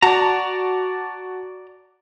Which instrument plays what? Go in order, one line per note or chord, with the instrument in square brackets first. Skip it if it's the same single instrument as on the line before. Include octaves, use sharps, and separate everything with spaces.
[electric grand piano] F#4 A5 [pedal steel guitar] D5 A#5